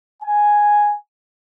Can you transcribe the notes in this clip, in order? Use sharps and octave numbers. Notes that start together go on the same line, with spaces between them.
G#5